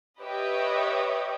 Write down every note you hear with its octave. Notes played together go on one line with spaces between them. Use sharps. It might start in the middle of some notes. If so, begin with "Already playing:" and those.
G4 B4 C#5 D#5 E5